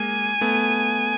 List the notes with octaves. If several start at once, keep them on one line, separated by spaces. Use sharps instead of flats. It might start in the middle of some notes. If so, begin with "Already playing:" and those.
Already playing: G#3 A#3 G#5
A3 B3